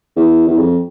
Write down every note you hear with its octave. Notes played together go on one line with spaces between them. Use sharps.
E2
E2
F2